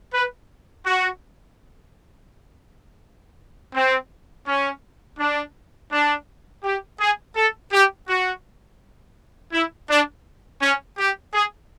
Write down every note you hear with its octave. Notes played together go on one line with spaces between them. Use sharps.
B4
F#4
C4
C#4
D4
D4
G4
G#4
A4
G4
F#4
E4
D4
C#4
G4
G#4